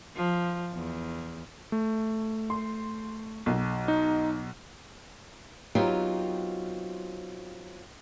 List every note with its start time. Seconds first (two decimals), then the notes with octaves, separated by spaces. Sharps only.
0.16 F3
0.74 E2
1.72 A3
2.50 C6
3.46 B1
3.88 D#4
5.75 F#3 B3 C4 D#4 F4 G4